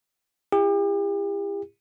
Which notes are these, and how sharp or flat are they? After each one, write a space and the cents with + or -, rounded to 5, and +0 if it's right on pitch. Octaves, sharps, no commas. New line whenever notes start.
E4 +25 G4 +40